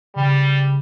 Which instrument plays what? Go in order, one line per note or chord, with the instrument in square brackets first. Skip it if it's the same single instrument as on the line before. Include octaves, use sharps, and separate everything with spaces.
[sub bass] C#3 [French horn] G3